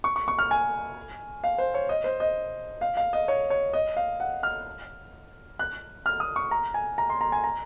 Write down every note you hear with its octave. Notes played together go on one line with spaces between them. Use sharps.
C#6
C#6
C#6
F6
G#5
F5
C5
C#5
D#5
C5
D#5
F5
F5
D#5
C#5
C#5
D#5
F5
F#5
F6
F#6
F6
D#6
C#6
A#5
G#5
A#5
C6
A#5
G#5
A#5